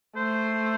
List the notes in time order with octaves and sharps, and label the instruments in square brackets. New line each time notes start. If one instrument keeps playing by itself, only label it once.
[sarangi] A3 [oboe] C5